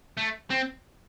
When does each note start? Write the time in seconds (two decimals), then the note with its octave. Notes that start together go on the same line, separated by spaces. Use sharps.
0.17 A3
0.50 C4